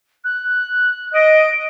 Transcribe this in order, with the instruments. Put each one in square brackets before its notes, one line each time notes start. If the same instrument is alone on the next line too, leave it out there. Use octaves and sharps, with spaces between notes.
[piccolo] F#6
[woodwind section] D#5 [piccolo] D7